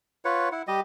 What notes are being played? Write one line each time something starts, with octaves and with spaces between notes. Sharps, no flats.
F4 B4 C#5 F#5
E4 F#5
G3 G4 D#5